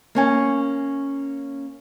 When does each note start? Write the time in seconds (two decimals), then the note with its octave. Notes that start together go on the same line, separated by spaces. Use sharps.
0.15 A#3 C#4 G#5